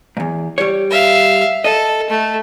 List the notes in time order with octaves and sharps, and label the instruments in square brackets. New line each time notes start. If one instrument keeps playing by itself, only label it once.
[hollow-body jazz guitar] E2 G#2
G3 C#5
[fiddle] E5 F5
[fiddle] A4 [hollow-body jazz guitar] D#5
[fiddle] A3